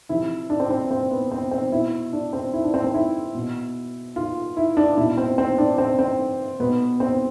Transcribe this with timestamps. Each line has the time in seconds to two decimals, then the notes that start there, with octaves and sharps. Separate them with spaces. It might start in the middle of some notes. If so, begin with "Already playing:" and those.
0.09 C3 F3 E4
0.50 D4
0.60 C4
0.71 C4
0.91 C4
1.11 B3
1.31 C4
1.51 C4
1.72 B2 E4
2.13 D4
2.33 C4
2.53 E4
2.64 D4
2.74 C4
2.84 C4
2.94 E4
3.35 B2
4.16 F4
4.57 E4
4.77 D4
4.97 B2 E4
5.17 C4
5.38 C4
5.58 D4
5.78 C4
5.99 C4
6.60 B2 B3
7.00 C4